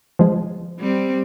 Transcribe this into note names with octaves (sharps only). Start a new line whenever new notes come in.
F3 G#3
G3 C4